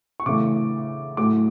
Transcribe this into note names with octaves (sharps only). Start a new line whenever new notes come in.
C#6
C#3 E3 A3 D6
A2 F#3 A3 D6